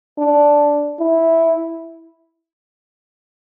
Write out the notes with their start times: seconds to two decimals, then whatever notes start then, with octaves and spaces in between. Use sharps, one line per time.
0.18 D4
0.99 E4